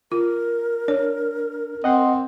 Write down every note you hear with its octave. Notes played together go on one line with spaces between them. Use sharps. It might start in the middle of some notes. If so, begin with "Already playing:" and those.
F4 A#4
D4 C#5
C4 D#5 F#5 C6